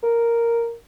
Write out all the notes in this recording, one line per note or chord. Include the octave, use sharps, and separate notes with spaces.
A#4